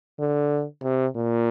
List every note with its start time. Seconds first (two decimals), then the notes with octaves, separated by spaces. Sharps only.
0.20 D3
0.84 C3
1.16 A#2